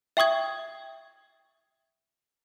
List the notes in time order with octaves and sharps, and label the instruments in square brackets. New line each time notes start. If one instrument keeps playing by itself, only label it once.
[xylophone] E5 G5 C#6 D#6 G#6